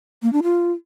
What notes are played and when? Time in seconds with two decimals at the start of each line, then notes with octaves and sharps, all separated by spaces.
0.22 A#3
0.33 D4
0.43 F4